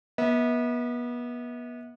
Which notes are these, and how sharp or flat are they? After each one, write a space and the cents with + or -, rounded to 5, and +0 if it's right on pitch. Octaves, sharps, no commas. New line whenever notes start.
B3 -30 E5 -40